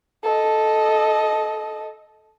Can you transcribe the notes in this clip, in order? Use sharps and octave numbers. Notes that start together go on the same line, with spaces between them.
A4 D#5